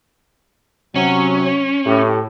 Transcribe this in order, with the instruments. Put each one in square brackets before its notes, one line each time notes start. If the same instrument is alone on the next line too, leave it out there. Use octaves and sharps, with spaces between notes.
[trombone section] C3 F#3 [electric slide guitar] C#4
[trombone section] A2 G4